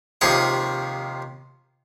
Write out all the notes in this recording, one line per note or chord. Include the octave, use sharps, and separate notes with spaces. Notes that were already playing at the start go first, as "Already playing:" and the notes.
D#2 C3 F3 G#4 C#5 C#6